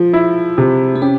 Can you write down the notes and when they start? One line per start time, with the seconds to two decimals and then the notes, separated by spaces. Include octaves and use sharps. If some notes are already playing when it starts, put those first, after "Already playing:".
Already playing: F3 F4
0.13 E4
0.58 C3
0.96 C4
1.02 C#4 G4